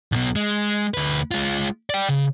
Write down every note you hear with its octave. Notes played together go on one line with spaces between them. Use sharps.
B1 B2
G#3
D2 B4
G#3 F4
D5 G5
C#3